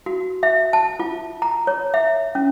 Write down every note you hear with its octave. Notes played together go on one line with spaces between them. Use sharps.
F#4
E5
A5
F4
A#5
C#5
E5
C#4